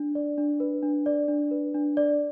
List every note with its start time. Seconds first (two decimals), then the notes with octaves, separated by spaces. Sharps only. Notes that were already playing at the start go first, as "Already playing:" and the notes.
Already playing: D4
0.15 D5
0.38 D4
0.60 B4
0.83 D4
1.06 D5
1.28 D4
1.51 B4
1.74 D4
1.97 D5